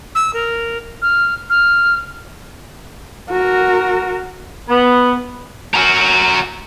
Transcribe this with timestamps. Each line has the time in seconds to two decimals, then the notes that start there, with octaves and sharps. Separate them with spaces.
0.15 E6
0.34 A#4
1.02 F6
1.50 F6
3.30 F#4 A#4
4.69 B3
5.74 F#4 A#4